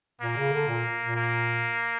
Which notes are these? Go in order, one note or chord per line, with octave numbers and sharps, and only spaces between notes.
A#2 A#3
C#3
D3
A#2
A#2
A#3